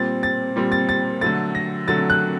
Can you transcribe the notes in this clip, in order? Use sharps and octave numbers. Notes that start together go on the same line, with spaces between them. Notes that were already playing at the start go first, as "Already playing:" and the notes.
Already playing: A#2 G3 C4 A6
A6
A#2 G3 C4
A6
A6
D3 F#3 A3 A6
A#6
D3 F#3 A3 A6
F#6